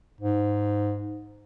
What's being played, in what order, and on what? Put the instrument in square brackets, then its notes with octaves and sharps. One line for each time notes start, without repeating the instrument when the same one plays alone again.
[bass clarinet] G#2